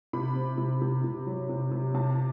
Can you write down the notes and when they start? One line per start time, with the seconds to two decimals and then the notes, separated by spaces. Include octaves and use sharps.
0.13 C3 B5
0.35 C4
0.58 C3
0.81 C3
1.04 C3
1.26 F#3
1.49 C3
1.71 C3
1.94 C3 A5